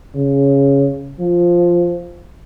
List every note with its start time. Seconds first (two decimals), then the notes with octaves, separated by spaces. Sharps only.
0.15 C#3
1.19 F3